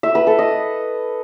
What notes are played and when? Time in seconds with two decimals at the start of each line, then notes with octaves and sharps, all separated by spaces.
0.03 E5
0.15 B4
0.27 A4
0.39 D#5